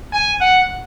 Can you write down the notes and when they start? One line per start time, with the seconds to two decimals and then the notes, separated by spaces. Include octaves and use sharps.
0.13 G#5
0.41 F#5